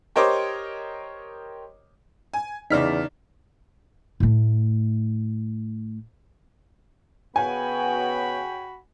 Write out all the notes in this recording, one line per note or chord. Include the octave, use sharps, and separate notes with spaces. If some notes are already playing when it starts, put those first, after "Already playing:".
G4 A#4 C5 C#5 D#5 D6
G#5
E2 C#3 D#4 D5 F6 B6
A2 A3
C#3 B3 F#4 G5 G#5 B5